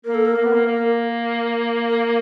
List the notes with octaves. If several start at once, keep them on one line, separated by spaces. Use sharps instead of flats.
A#3 A#4
A4
A#4
A#3
B3
A#3
A#3
A#4